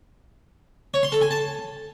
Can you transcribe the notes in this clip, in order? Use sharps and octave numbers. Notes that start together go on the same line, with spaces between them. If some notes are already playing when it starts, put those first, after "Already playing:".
C#5
C6
A4
G#5
A5